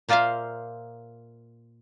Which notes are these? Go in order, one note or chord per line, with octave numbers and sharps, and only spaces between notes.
A#2 A#3 F4 C5 E5 F5